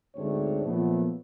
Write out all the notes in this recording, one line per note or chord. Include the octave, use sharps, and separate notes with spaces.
D2 G#2 A3 C4 D4 C#5
A#2 F3 F#3 A3 B3